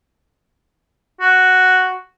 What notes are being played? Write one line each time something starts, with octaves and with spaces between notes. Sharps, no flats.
F#4